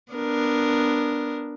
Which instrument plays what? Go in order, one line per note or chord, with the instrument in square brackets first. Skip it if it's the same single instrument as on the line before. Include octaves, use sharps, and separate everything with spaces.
[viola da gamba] B3 D4 A#4